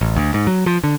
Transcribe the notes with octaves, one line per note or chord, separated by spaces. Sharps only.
A1
D2
G#2
F#3
F3
D3